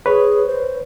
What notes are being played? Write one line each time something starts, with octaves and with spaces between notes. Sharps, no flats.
G#4 B4 C#5
C5